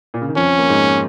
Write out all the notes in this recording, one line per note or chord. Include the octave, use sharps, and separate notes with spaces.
A#2
C#3
D#3
F2 F3 C#4
A#3
G#2 G#3